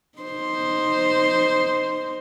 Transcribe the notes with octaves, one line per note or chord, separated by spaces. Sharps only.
D#4 C5